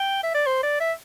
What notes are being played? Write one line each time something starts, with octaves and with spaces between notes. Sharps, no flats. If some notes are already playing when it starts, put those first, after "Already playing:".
Already playing: G5
E5
D5
C5
D5
E5